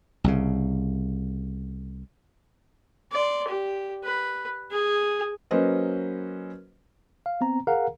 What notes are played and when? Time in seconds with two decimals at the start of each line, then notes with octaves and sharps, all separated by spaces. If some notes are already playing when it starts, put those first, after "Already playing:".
0.24 C2 C#3
3.12 D5 C6
3.47 G4
4.04 B4
4.71 G#4
5.51 F#3 A#3 C#4 B4 C5 D#5
7.26 F5
7.41 B3 C4 A#5
7.67 G#4 A#4 F5 F#5 A#5